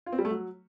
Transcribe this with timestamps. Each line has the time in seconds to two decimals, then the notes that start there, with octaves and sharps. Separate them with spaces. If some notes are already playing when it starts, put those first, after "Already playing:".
0.06 F4
0.13 C4
0.19 G3
0.25 A3
0.31 F#3